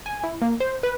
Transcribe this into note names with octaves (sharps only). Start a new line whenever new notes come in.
G#5
E4
A#3
C5
B4